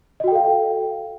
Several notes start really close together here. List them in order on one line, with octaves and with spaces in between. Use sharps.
D#5 F#4 G5 A4 F5